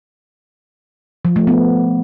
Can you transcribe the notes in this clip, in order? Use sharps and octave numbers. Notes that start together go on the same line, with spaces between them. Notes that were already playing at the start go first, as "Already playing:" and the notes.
F3
A3
B3